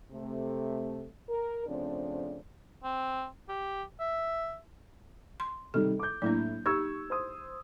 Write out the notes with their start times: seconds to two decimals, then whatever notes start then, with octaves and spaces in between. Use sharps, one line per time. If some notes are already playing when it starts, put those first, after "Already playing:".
0.11 C3 A3
1.30 A#4
1.67 C#3 F3 A3 C4 D4
2.84 C4
3.49 G4
4.00 E5
5.40 C6
5.74 C3 D#3 G3 A4
5.99 D6 G6
6.22 A2 F#3 A#3 D4
6.66 D#4 G4 C#6 E6 G#6
7.10 C5 C6 D#6